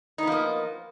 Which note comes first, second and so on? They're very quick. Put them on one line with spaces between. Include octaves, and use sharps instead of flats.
D#4 B3 F3 A#3